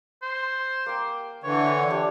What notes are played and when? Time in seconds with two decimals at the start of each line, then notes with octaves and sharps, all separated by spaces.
0.22 C5
0.86 A#3 G5
1.44 D3 E3 C#5
1.90 D4 F4 G4